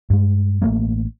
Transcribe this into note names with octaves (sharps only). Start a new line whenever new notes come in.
G2 G#3
A1 F#3 A3 A#3